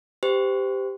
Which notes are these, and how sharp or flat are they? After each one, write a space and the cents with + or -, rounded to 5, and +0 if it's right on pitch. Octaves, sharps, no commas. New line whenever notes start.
G4 +0 C5 -30